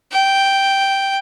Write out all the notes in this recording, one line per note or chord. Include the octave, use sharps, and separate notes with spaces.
G5